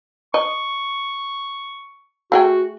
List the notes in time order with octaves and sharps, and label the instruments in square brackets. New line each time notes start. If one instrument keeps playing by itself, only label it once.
[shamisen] D#5 [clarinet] C#6
[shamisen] A3 G#4 G5 [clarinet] F#4